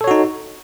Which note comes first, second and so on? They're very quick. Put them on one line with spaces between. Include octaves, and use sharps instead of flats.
A4 C#5 F#4 D#4